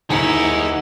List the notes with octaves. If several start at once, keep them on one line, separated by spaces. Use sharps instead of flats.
D#2 D#3 D#4 E4 G#4 F#5